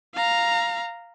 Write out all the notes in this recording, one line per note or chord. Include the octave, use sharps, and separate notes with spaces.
F5 A#5